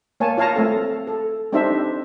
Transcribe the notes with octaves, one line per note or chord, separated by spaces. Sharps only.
A#3 C#5 G#5 A5
F4 C#5 F5 A5 A#5
A3 C4 A4
A4
C4 D4 D#4 G4 C5 E5